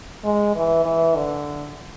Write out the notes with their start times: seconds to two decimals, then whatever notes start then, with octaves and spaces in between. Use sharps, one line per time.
0.24 G#3
0.55 E3
0.85 E3
1.16 D3